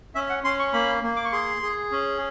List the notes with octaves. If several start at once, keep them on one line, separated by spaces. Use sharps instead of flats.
C#4 E5
F#5
C#4 C6
C#6
A#3 B5
A#3
D6
C#6
G#4 C6
G#4
C#4